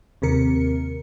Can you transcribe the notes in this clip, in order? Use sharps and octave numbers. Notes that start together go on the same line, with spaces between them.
D#2 C3 A#4 C#7